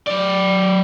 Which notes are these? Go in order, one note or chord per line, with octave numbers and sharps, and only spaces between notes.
F#3 D5